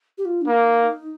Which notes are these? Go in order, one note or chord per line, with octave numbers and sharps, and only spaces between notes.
G4
F4
D4
A#3 D#4